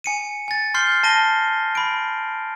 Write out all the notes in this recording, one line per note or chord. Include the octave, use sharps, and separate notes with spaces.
G#5 C#7 D#7
G#5 A6
C6 F6 G6 C7 G7
A5 A#6 D#7 G7
B5 D7